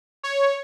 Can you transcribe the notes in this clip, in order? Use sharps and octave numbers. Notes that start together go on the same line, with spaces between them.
C#5